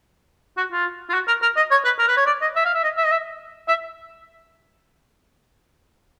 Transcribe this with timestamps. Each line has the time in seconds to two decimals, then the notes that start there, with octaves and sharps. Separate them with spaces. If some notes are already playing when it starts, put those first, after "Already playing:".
0.57 F#4
0.72 F4
1.09 F4
1.13 F#4
1.27 A#4
1.42 A#4
1.56 D#5
1.71 C#5
1.84 B4
1.99 A#4
2.08 B4
2.17 C#5
2.26 D5
2.41 D#5
2.56 E5
2.65 F5
2.74 E5
2.83 D#5
2.97 E5
3.04 D#5
3.11 E5
3.68 E5